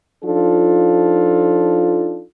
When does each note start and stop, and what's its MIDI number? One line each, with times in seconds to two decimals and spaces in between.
0.24 2.22 53
0.24 2.22 62
0.24 2.22 63
0.24 2.22 65
0.24 2.22 69